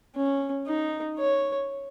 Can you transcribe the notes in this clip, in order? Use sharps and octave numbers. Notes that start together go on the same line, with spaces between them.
C#4
D#4
C#5